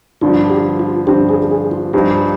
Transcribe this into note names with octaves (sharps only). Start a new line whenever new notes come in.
G2 D3 F3 C4 F4
G4
F4
G2 D3 F3 C4 G4
G#4
G#4
F4
G2 F3 C4 D#4 G4 G#4